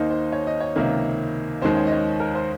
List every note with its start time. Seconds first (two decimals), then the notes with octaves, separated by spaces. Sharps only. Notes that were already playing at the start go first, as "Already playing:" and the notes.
Already playing: D#2 D#3 A#3 D#4 C5
0.10 C5
0.32 C#5
0.47 D#5
0.60 C#5
0.76 C#2 C3 D#3 A#3
1.62 D#2 D#3 G#3 C#4 C5
1.76 C#5
1.87 D#5
1.92 C#5
2.20 A#4
2.35 C5